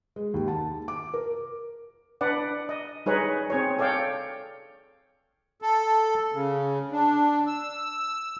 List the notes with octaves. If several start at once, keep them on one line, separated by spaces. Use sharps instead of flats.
G#3
D#2
A5
D6
A#4
D4 B4 D5 F#5
D#5
G3 D#4 G#4 B4 C#5 D#5
C4 G#4 C#5
A4 C#5 D5 F5 G5
A4
C#3
D4
E6